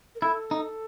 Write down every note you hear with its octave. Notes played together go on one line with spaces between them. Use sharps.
A#4
E4 A4
D#4